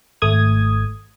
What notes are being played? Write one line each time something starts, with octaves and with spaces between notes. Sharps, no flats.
G#1 A3 D#6 G#6